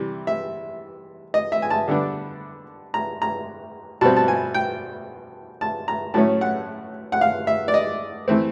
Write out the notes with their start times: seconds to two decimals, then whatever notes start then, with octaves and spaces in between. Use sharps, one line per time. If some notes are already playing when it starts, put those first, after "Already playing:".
Already playing: C3 E3 G3
0.27 E5
1.34 D#5
1.52 E5
1.62 G#5
1.70 A5
1.88 D3 G3 B3 D4
2.94 A#5
3.22 A#5
4.01 B2 G3 C4 A5
4.17 A5
4.28 G#5
4.54 G5
5.61 A5
5.88 A#5
6.14 A2 F#3 A3 C#4 A5
6.41 F#5
7.12 F#5
7.21 F5
7.47 E5
7.68 D5
7.74 D#5
8.28 E3 A3 C4